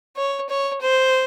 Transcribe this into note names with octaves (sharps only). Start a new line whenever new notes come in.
C#5
C#5
C5